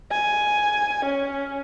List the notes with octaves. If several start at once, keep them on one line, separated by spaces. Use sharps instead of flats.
G#5
C#4